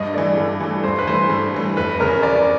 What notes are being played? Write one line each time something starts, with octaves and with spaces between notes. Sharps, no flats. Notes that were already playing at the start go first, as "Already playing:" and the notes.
Already playing: G2 D#5
E3 A3 D5
G2
E3 A3
G2 C5
B4
E3 A3 C5
G2
E3 A3
F1 B4
E2 C#3 A#4
F1 D5